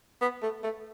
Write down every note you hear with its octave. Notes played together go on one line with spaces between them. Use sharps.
B3
A3
A3